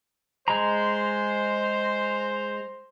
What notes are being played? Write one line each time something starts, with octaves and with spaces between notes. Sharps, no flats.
G#3 C5 A#5